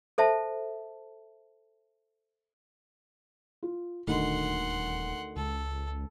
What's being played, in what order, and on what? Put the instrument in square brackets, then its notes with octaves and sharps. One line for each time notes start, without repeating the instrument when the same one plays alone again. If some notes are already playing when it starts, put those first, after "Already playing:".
[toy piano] A4 C5 E5 A5
[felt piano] F4
[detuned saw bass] D#1 [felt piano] D2 D#3 [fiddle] F#5 C6
[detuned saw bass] C#2 [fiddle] A4